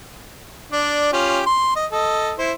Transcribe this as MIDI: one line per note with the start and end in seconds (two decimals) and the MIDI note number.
0.72 1.12 62
0.72 1.12 74
1.13 1.41 61
1.13 1.41 65
1.13 1.41 67
1.46 1.74 84
1.76 1.86 75
1.92 2.32 69
1.92 2.32 75
2.39 2.52 64
2.39 2.52 72